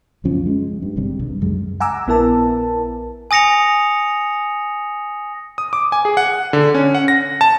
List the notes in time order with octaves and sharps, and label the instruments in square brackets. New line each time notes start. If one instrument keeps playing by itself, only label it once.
[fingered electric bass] C#2 F#2 F3 C#4
G#3
G2
G#1 G2 C3 G3
C2 G2
C#2 F#2 G#3
[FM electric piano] F#5 G#5 A#5 D6 E6
A#1 B3 E4 A#4 A5
[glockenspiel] G#5 D#6 A#6 C#7 F7
[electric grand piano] D#6
D6
G#5
G#4
F#5
D3
C#4
F#5
A#6
A5